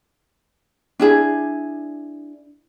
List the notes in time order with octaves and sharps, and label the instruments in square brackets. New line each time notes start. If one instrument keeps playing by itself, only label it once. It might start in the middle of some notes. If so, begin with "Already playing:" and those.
[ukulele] D4 E4 G#4